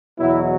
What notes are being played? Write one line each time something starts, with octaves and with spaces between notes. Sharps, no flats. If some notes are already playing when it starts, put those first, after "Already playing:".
E2 B2 F#3 B3 E4